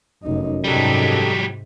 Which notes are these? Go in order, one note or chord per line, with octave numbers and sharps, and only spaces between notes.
F1 F#2 D#4
G#2 C3 F#3 G3 D#4 G4 A4